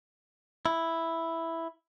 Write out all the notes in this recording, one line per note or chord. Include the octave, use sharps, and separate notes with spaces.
E4